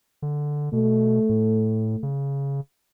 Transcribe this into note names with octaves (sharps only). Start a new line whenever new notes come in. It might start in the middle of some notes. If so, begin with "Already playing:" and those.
D3
B2 A3
A2
C#3